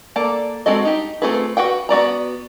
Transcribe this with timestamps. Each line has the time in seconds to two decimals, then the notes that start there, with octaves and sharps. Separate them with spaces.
0.16 A#3 A4 D5
0.66 G#3 C4 F#4 A4 D#5
0.85 D#4 G4
1.22 A3 C4 F4 G#4 B4
1.57 F#4 B4 F#5 G5
1.89 B3 F#4 D5 A#5